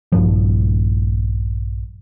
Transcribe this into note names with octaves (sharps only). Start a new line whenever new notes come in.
A#1 G2 F3